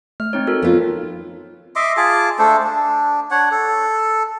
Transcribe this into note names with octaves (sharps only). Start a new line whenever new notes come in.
A3 F6
C4 D#4 C#5
F#4 A4 A#4
F3 B3 F4
D#5 E5 C6 D6
F4 G#4 A5 D6
A3 D4 A4 C5
D4
D4 C#5 F#5
A4